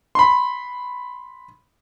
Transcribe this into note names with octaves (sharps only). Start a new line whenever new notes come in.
B5 C6